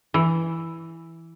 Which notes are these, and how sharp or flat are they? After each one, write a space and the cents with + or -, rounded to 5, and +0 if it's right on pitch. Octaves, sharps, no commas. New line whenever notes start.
E3 +0